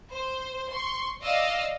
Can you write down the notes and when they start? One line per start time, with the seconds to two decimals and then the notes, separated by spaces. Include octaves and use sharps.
0.14 C5
0.72 C6 C#6
1.23 D5 D#5 F5 E6